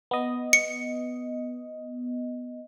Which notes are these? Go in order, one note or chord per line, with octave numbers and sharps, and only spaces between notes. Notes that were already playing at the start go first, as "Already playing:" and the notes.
B3 D#5
C#7